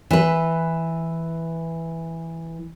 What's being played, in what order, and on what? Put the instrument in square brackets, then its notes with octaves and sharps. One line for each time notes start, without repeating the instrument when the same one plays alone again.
[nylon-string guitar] E3 B4